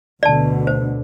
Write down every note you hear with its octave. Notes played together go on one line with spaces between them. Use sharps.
D2 B2 D3 D5 A5
C5